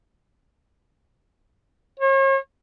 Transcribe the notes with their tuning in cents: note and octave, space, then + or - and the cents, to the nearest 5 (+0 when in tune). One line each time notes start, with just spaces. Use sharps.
C#5 -40